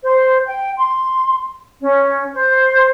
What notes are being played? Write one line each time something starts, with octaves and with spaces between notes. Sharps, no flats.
C5
G5
C6
C#4
C5